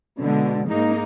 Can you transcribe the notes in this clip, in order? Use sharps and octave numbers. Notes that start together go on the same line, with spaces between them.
B2 D3 G#3
G#2 G#3 A#3 D#4